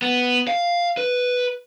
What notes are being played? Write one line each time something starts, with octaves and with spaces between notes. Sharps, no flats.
B3
F5
B4